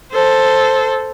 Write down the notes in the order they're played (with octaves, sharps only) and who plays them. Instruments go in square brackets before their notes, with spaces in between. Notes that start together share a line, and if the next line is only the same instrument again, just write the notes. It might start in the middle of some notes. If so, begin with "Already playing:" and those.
[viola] A4 C5